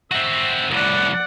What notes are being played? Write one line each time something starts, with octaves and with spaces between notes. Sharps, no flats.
C4 F#4 E5
C2 A2 D5 F#5